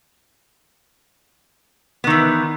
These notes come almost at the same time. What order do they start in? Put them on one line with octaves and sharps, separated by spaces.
B3 D#3 E3